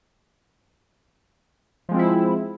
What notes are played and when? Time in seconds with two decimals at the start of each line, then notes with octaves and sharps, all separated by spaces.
1.89 F3
1.91 G#3
1.94 C4
1.96 F4
1.99 E4